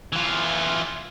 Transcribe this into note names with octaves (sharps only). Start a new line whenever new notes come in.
E3 F4